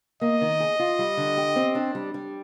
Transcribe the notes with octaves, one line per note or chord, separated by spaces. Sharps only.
A#3 D#5
D#3
G#4
F4
G3
D3
G4
C4
D4
G3
G3